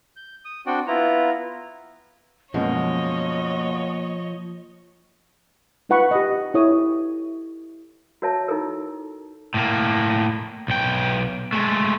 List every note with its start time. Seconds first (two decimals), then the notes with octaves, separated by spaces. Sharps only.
0.16 G6
0.45 D#6
0.67 C4 D4 F#4 D5 G5
0.87 B3 E4 F4 A#5
2.54 F#2 B2 F3 G#3 A#3 C#5 D#5
5.89 D#4 F4 B4 F#5 B5 C#6
6.11 G4 D#5
6.54 E4 A4 C#5 D#6
8.22 F#4 A#4 C#5 E5 A5
8.48 D#4 E4 A4 A#4
9.54 A2 A#3
10.68 B1 G5
11.53 G#3 A3